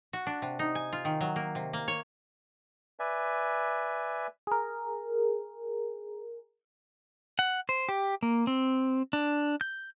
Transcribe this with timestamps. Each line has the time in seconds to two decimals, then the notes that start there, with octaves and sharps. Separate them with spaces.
0.13 F#4
0.27 D4
0.42 C3
0.59 D#4
0.75 G#5
0.93 F4
1.05 D#3
1.21 F#3
1.36 A#3
1.55 C3
1.73 A#3
1.88 C#5
2.99 B4 D5 E5 G#5
4.47 G#4 A#4
7.39 F#5
7.69 C5
7.89 G4
8.23 A#3
8.47 C4
9.13 D4
9.61 G6